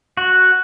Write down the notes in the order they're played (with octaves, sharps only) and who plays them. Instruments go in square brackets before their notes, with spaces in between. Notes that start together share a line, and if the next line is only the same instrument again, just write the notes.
[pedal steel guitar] F#4